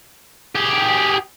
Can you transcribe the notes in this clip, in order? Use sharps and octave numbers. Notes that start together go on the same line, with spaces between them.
G4 G#4